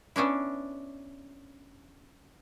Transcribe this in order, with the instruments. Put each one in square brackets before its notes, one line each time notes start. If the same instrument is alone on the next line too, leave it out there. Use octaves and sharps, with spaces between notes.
[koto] B3 C#4 D4 E4